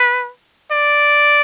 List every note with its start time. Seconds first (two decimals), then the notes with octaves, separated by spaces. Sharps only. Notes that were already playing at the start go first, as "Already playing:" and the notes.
Already playing: B4
0.72 D5